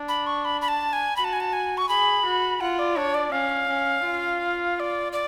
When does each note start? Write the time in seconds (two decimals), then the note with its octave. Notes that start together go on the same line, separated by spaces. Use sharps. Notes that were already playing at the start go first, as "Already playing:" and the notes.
Already playing: D4
0.08 B5
0.27 C#6
0.45 B5
0.61 B5
0.68 A5
0.93 G#5
1.16 F#4 B5
1.24 A5
1.33 G#5
1.40 A5
1.53 G#5
1.77 C#6
1.88 G#4 B5
2.25 F#4
2.60 F4 F#5
2.79 D5
2.96 D4 C#5
3.14 D5
3.32 C#4 F5
3.68 C#4
4.05 F4
4.76 F5
4.80 D5
5.12 D5